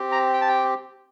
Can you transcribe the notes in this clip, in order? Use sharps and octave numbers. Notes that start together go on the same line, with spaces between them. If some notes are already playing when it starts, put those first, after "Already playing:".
Already playing: C4 G4
A#5
G5
A5
G5